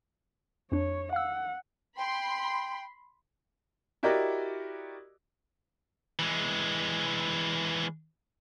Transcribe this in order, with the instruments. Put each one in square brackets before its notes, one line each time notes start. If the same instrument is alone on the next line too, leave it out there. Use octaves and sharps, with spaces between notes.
[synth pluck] F2 D4 [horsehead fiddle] C#5
[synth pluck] F5 E6 [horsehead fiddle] F#5
[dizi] G5 [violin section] B5 C6
[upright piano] E4 F#4 G4 A#4 D5 D#5
[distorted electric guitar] E3 G#3